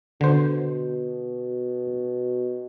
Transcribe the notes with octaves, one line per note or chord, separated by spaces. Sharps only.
B2 D3 C5